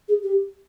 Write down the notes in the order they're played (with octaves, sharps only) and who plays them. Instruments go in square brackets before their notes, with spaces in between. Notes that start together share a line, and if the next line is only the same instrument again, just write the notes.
[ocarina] G#4
G4